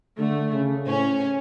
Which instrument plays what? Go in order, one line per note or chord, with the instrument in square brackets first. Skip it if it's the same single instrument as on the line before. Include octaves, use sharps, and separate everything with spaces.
[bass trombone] D3 [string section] A3
[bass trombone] C#3
[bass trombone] A2 [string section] C#4